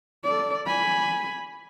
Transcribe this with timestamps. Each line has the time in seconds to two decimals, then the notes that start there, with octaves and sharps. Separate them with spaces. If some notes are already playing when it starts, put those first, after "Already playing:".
0.25 A4 D5
0.67 G#5 B5